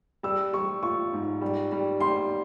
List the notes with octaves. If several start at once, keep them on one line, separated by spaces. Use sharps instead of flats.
G3 E6
G3 C#6
F4 C#6
G#2
G3
G3
G3 C6